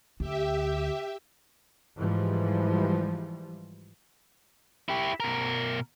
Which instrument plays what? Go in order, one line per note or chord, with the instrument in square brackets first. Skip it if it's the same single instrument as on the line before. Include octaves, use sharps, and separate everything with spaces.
[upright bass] D2 [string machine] G4 E5
[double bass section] G#2 E3 F3 G3
[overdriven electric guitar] E4 G4
B2 A#4